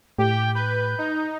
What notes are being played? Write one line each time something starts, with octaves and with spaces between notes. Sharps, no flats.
A2 G4 G5
B4 G6
D#4